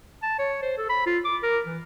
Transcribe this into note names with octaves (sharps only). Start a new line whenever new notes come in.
A5
C#5
C5
A4
B5
F4
D6
A#4
E3